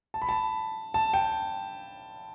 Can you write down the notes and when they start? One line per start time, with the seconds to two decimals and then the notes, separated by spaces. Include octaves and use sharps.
0.14 A5
0.22 B5
0.29 A5
0.94 A5
1.14 G5